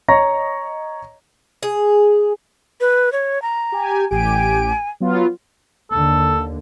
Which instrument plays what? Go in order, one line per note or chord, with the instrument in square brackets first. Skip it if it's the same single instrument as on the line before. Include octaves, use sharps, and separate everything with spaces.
[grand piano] C#5 D#5 A#5 C#6 A#6
[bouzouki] G#4
[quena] B4
C#5
A#5
[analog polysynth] G4 G#5
[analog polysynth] A1 G4 D7 [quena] G#5
[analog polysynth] F#3 B3 F4
[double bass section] D#2 D3 [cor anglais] A4